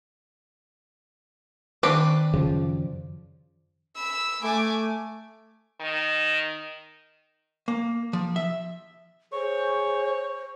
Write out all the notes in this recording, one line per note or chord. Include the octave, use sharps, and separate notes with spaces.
D#3 C4 D4 B4 D6
F#2 C#3 F3
B5 E6
A3 G#5 D6
D#3
A#3
F3
E5
G#4 C5 C#5